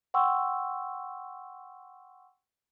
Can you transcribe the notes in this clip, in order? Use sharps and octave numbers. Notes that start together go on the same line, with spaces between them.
F#5 G5 C6 C#6 E6